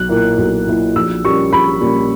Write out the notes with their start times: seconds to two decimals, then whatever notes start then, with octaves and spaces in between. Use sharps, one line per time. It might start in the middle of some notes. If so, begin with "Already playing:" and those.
Already playing: B1 F#6
0.09 A#2 A#3 E4
0.38 B1
0.67 A#2 A#3 E4
0.95 A#1 E6
1.24 A#2 G3 A#3 C#4 C#6
1.52 A#1 B5
1.81 A#2 G3 A#3 C#4